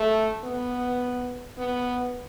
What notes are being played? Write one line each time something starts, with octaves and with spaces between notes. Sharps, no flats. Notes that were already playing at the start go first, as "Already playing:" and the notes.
Already playing: A3
B3
B3